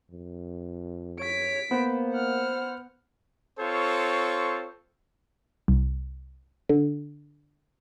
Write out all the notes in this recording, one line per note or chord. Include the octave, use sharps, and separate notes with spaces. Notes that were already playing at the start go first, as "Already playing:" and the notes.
F2
C#5 B6 D7
A#3 B3 C5
F#5 F6
C4 F4 A4 C5 C#5 C#6
C2
D3